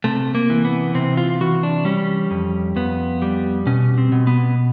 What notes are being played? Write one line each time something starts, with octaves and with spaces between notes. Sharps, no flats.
C3 A3
A#3
E3
B3
C3 C4
F4
E3 F#4
D4
G3 C#4
F2
F2 B3
G3
B2 C#4
C4
B2
B3